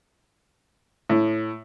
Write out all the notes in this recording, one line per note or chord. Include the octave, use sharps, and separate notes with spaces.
A2